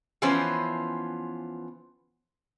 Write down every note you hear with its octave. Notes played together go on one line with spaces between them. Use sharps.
E3 F3 B3 C#4 C5